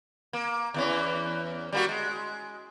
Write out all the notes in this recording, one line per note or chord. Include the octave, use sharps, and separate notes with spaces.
A#3
E2 E3 C#4
G3 A#3 F#4
G#3